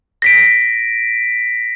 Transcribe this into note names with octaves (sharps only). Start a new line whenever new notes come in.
A#6 B6 D7